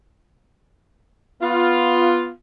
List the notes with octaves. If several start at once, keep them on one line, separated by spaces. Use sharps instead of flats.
B3 F4